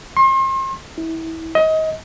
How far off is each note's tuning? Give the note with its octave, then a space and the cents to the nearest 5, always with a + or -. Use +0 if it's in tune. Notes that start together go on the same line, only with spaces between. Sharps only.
C6 +40
E4 -25
D#5 +25